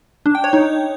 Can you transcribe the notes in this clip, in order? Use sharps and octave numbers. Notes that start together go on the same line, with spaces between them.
D4
G5
C#5
D#4